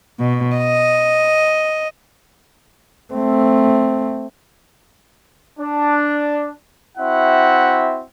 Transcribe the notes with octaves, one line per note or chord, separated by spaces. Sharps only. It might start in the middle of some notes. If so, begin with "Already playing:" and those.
B2
D#5
A3 C4
D4
C4 E4 F#4 E5 F#5